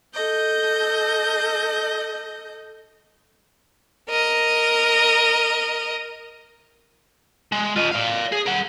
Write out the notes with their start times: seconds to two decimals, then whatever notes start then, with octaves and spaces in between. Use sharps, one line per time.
0.13 A4 D#5 G6
4.10 A#4 D#5
7.52 G#3
7.76 F4 D#5
7.92 D5 F5
8.32 G#4
8.47 A#4 F#5